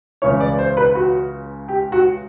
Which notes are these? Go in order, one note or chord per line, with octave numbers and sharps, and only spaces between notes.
C#2 C#3 E3 C#5
D5
C5
B4
F#4
G4
F#4